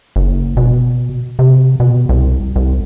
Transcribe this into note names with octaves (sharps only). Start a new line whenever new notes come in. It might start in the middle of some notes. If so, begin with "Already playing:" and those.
F#1
B2
C3
B2
C2
C2